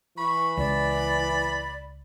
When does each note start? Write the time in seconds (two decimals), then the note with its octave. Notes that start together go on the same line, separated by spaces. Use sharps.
0.18 E3 B5 C#6
0.57 C#2 D5